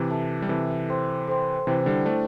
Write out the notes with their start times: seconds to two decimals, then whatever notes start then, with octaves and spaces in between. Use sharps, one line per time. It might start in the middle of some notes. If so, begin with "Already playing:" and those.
Already playing: C3 E3
0.10 A4 E5 A5
0.42 G3
0.49 C3 E3 A4 E5 A5
0.89 A4 C5 G5 C6
1.28 A4 C5 G5 C6
1.67 C3 E3 E4 C5 G5
1.86 D3 G3
2.06 A3 D4 E4 C5 G5